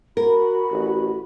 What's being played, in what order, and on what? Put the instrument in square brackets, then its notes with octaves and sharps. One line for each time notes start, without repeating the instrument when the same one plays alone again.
[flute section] F#4 B5 [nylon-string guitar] A#4
[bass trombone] A1